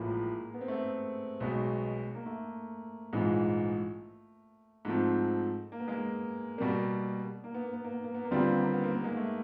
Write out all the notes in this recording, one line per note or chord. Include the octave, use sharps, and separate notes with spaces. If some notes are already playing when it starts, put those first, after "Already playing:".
Already playing: A1 A2 F3 G#3 A#3
B3
C4
A3 B3
B1 B2 G#3
A#3
A3
A#1 G#2 E3 G#3
G#2 F3 A3 C4
A#3
B3
G#3 A#3
B2 G3 A#3
A#3
B3
A#3
B3
A#3
B3
A#3
B3
A#3
D#2 D3 G3 B3 C4 F4
A#3
B3
A#3
B3
A#3
B3
G#3 A#3
A3